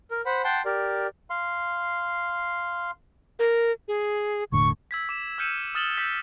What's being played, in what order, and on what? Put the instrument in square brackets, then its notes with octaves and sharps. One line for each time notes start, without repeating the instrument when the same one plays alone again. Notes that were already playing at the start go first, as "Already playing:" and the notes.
[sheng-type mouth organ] A#4
C5 F#5 B5
F#5 G5 A5 C6
G4 A#4 D5
[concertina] F5 C6
[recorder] A#4
[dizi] G#4
[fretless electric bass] E1 A2 D3 [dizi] C#6
[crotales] E6 G#6 B6
D6 E7
E6 F6 G6 C#7 D#7 E7
D#6 F6 A6 E7 F#7 G7
E6 G6 B6